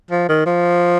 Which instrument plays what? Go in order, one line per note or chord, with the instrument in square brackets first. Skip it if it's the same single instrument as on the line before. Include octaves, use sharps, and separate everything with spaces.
[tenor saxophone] F3
D#3
F3